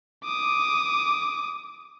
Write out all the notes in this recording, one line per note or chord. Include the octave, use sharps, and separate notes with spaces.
D6 D#6